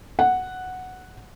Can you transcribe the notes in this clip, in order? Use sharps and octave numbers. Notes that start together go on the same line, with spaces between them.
F#5